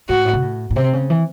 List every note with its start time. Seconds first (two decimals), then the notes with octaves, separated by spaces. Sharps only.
0.09 G#2 F#4
0.25 A2
0.33 C3
0.42 A2
0.71 A2
0.76 C3 C4
0.93 C#3
1.10 E3